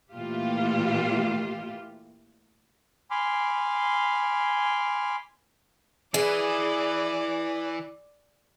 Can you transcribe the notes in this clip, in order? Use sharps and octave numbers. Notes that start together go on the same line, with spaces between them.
A#2 E3 A3 A#3 F4 G4
G#5 B5 C6 D6 F6
E3 G#4 B4 D5